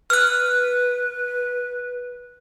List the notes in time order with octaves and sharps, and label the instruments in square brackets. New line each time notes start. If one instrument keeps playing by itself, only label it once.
[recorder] B4 [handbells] F6 F#6